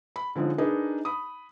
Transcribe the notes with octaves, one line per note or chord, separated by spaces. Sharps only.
B5
D3 F3 G#3 C#4 D#4
D4 D#4 G#4 A#4 B4
B5 D#6